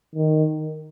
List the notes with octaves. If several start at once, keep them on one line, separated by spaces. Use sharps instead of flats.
D#3